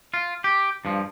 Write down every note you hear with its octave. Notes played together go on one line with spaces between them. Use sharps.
F4
G4
G2 F3